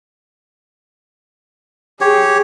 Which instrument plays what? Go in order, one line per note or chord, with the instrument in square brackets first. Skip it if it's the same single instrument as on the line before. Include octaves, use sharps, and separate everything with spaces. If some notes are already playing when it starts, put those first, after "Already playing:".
[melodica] G4 C#5 [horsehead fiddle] G#4